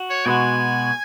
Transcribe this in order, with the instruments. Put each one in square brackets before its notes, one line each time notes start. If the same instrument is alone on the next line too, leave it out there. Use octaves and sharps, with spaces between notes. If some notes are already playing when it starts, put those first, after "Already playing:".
Already playing: [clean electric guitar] F#4
[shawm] C#5
[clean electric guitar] B2 G#3 B3 F#4 [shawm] G#5